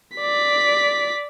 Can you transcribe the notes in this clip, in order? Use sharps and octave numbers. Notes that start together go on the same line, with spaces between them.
D5 B6